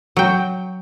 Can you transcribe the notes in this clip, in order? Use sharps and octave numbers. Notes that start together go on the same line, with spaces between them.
F#3 G5